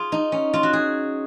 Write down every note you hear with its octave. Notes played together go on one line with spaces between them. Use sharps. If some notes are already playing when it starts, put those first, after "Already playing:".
Already playing: F4 G#4
D#4
C#4
F4
F#4
G#4